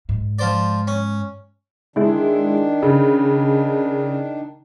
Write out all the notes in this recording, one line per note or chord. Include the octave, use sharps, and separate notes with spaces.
G#2
F3 C5 D5
C#4
D#3 G#3 D4 E4
C#3